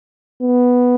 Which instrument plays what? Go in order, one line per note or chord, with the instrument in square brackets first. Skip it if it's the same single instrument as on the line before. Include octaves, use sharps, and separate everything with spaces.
[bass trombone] B3